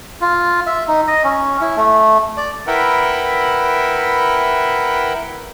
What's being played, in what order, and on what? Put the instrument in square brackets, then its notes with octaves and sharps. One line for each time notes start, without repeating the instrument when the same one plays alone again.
[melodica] F4
E5
D#4
D#5
C#4
E4
A3
D5
[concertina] E4 A#4 B4 E5 F#5 G5